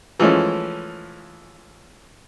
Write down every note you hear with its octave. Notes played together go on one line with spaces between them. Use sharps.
E3 F3 G#3 A3 C#4